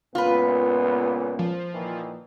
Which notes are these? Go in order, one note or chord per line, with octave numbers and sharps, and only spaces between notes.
C#2 A#2 B3 F4 B4
F3
A#2 D#3 E3